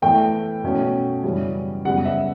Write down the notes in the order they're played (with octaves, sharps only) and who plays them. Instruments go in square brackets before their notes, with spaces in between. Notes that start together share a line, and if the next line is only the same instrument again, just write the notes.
[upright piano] A2 E3 A3 G5
B2 A3 C#4
F#2 C#3 E3 G3 C#4
F#2 C#3 G3 B3 F#5
E5